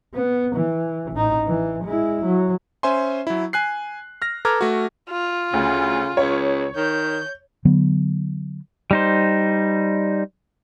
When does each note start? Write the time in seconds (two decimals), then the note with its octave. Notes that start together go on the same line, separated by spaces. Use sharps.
0.14 B3
0.56 E3
1.12 A1 D#4
1.47 E3
1.84 G#3 E4
2.24 F#3
2.83 C#4 C5 E5 G#5 C6
3.27 F#3 E4
3.53 G#5 F#6 C7
4.22 F6 A#6
4.45 A4 B4 A#5 D6 F6 G#6
4.61 A3 F#4
5.10 F4
5.54 D2 C#3
6.17 C#2 C#5
6.76 D#3 G6
7.65 D3 F#3 B3
8.91 G3 D#4 C5